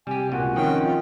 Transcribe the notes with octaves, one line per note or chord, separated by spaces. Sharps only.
C3 G3 G4 G#5
C#2 A#2 F#4
D#3 F3 C4 C#4 C5 G5
F4